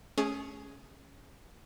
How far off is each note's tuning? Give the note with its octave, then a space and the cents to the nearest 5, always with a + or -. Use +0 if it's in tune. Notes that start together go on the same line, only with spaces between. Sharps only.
A3 -35 C#4 +0 G#4 +0